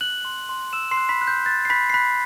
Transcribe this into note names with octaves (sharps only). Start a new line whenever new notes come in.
F#6 F#7
C6
C6
C6 E6 E7
C6 C7
F#6
B5 B6
F#6
G6
F#6 A6
C7
B5 F#6 B6
C7
B5 F#6 B6